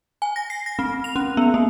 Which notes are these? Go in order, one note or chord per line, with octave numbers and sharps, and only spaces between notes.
G#5
A#6
C7
A#6
C4
F7
C#4
B3
A#3